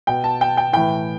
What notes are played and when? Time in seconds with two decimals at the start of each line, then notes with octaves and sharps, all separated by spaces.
0.07 B2 G5
0.24 A5
0.41 G5
0.57 G5
0.73 A2 E3 G5